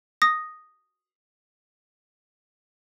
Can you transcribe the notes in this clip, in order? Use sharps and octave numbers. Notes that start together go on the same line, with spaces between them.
D#6 A#6